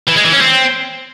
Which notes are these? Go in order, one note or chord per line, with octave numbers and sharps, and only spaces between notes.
E3
G#3
E3
C#4
C4